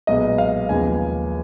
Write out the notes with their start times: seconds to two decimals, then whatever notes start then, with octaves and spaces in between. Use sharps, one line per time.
0.07 B1 A#2 G#3 B3 D#5
0.38 F5
0.69 D#2 C#3 F3 G#3 B3 G#5